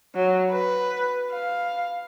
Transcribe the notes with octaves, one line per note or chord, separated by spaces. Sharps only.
F#3
B4
F5